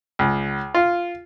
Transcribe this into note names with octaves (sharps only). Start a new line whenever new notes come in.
C#2
F4